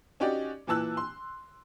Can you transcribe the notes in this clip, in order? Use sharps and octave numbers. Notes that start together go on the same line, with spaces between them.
C#4 D#4 F#4 G4 D5
A#2 E3 A5 E6 F#6
C6